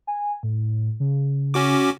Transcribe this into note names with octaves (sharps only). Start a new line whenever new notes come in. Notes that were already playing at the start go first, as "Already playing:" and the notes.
G#5
A2
C#3
C#4 F#4 D6